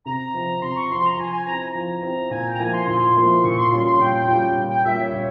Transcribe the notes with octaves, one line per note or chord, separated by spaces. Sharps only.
C3 A#5
F3 C4
C3 C6
C#6
F3 C4 C6
A#5
F3 G#5
G#5
C4 E4 A#5
A#5
F3
C4 E4
A#2 G#5
G5
A#5
F3 A#3 E4 G#5
C6
A#2 C6
F3 A#3 E4
A#2 C#6
C6
G3 C#4 F4 C6
C6
A#2 G5
G3 C#4 F4
A#2
G5
G3 A#3 C#4 F4 E5
C#5
A#2